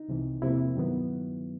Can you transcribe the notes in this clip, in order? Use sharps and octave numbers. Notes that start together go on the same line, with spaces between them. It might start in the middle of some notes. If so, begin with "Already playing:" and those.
Already playing: D#4
C2 C3 E3
E2 C3 F3 A#3 E4
G2 D#3 F#3 B3